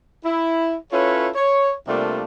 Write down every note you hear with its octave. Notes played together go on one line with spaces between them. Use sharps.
E4
C#4 E4 F4 A4 B4 C#5
C#5
C3 G3 A3 A#3 D4 F4